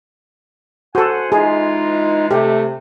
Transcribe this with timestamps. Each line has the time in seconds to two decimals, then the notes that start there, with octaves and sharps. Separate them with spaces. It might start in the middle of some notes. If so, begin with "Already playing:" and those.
0.95 F#4 A4 C5 F#5 G#5
1.32 E3 G#3 D#4 F4 G#4
2.31 C3 A3 G4